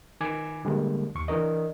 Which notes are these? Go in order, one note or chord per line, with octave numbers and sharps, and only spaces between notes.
D#3 G#5 D6 G#6
D3 G3 G#3 A#3
D#2 C#6
E3 D4 A#4 D#5